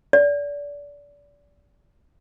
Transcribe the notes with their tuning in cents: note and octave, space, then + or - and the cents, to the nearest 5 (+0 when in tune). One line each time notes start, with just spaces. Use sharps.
D5 -25